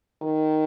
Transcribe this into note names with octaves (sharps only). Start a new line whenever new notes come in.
D#3